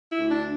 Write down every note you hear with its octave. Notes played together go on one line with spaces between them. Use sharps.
E4
D2
D4